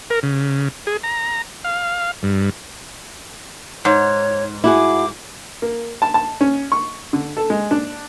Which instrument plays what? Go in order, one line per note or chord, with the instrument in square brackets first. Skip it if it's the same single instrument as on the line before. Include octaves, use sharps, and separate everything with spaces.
[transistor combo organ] A#4
C#3
G#4
A#5
F5
G2
[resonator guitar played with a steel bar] G#2 [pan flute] C#5
[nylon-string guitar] E4 F#4 G#4 [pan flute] D6
[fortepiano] A#3
A5
A5
C#4
C#6
D3
A4
G#3
D4